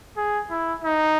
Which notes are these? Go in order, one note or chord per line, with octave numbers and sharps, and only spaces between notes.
G#4
E4
D#4